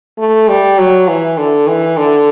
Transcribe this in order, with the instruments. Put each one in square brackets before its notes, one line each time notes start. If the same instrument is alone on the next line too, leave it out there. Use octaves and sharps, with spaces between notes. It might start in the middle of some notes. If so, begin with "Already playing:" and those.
[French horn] A3
G3
F#3
E3
D3
E3
D3